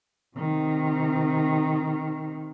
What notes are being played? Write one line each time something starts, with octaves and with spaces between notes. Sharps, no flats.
C3 D#3